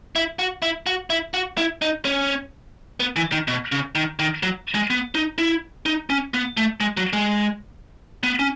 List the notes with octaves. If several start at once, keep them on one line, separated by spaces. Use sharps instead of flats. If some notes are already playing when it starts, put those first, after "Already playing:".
E4
F#4
E4
F#4
E4
F#4
E4
D#4
C#4
B3
E3
D#3
B2
C#3
D#3
D#3
F#3
G#3
B3
D#4
E4
D#4
C#4
B3
A3
G#3
F#3
G#3
B3
C#4